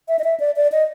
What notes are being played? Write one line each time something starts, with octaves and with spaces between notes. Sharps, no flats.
E5
D#5
E5
D5
D5
D#5